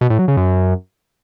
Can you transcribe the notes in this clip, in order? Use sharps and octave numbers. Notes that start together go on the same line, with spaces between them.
B2
A2
F#3
C#3
F#2